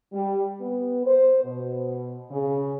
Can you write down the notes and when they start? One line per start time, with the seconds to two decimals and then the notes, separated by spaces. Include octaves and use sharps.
0.13 G3
0.60 B3
1.06 C5
1.44 B2
2.31 C#3